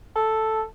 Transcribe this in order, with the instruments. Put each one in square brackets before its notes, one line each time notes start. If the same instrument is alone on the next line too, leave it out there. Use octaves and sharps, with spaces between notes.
[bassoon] A4